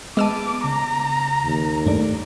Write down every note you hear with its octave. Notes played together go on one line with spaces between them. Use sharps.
G#3 B3 A5 D6 E6 D#7
C#3 A#5
D#2
G2 A3 D5